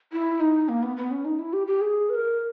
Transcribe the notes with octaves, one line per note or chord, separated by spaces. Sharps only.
E4
D#4
A#3
B3
B3
C#4
D#4
E4
G4
G4
G#4
B4
A#4